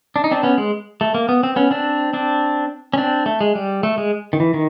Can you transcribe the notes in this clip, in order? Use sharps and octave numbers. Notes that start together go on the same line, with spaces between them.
D4
D#4
C4 D4
B3 C#4
G#3
A3
A#3
B3
C4
B3 C#4
C4 D4
C4 D4
C#4
C4 D4
A3
G#3
G3
A3
G#3
D#3
E3
D#3